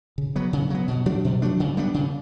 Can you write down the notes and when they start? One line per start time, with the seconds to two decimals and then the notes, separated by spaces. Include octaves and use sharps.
0.18 C#3
0.36 F#3 B3
0.53 C#3
0.70 F#3 B3
0.88 B2
1.06 F#3 A3 D4
1.24 B2
1.42 F#3 A3 D4
1.60 C#3
1.77 G3 B3 D4
1.94 C#3